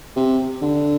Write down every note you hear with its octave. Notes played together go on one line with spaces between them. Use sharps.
C3
D3